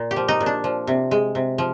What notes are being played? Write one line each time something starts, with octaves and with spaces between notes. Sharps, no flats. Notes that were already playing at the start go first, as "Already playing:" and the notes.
Already playing: A#2
G4
F3
D#4
A#2
D4
F3
C3
G#3
C3
F3